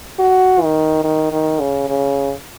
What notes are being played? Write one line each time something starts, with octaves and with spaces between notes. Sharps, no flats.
F#4
D#3
D#3
D#3
C#3
C#3